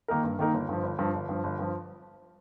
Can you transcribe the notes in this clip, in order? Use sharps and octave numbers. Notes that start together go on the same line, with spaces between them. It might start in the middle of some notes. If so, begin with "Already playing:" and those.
D#3 A#3 D#4 A#4
G2
D#3 A#3 D#4 A#4
G1
G2 F3
G1
G2 F3
G1
G2 F3
G1
G2 F3